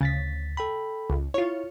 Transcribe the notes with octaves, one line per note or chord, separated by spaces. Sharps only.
D2 C#3 A6 B6
A4 G5 B5
C#2
E4 F4 C#5